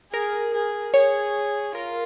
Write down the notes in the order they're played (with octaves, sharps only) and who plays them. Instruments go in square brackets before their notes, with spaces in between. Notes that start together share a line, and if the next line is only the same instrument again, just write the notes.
[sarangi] G#4 [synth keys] A#4
[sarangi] G#4
[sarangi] G#4 [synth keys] C#5
[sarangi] F4 [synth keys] A#4